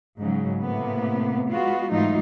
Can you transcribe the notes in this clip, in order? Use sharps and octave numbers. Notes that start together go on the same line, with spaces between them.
G#2 C#3 F#3
A2 C3 A#3 B3
G#3 B3 F4 F#4
G#2 E3 F#3 A3 D#4 F4